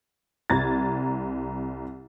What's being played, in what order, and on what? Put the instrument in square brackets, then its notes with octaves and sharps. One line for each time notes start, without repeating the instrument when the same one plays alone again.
[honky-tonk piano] C2 A#5 G#6 A6